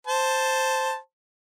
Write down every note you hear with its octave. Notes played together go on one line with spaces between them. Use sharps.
C5 A5